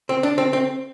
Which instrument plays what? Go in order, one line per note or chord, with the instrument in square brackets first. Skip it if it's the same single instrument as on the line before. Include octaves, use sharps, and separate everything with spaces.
[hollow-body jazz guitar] C4
D4
C4
C4